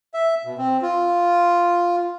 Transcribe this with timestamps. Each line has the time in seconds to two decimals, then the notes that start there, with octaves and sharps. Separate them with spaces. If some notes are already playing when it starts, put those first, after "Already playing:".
0.14 E5
0.45 B2
0.58 C4
0.82 F4